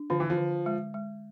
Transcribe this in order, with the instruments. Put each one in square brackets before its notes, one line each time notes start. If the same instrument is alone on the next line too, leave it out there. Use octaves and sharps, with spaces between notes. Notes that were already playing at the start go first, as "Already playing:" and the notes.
Already playing: [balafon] D4
[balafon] D3 [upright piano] F3
[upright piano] E3
F3
[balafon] D3
G#3
G#3